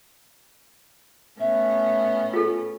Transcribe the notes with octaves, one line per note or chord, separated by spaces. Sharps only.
A2 B3 C#4 E5
F4 A4